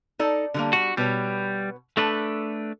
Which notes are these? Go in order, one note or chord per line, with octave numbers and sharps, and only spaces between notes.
D#4 A4 D5
D3 G3 A#3
G3 F#4
B2 G3 B4 C#5
A3 D4 A4 B4